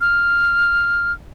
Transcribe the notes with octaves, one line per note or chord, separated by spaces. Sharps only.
F6